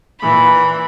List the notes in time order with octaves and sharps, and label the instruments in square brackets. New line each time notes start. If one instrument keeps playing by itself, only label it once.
[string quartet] A#2 E3 B5